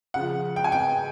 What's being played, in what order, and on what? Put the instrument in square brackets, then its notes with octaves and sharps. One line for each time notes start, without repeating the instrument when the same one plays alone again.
[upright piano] C#3 F3 F#5
G5
G#5
G5